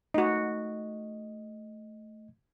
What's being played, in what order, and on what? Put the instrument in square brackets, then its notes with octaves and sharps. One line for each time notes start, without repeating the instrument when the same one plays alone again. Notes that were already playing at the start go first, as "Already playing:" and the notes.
[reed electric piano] A3 D#5 [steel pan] D#4 F#4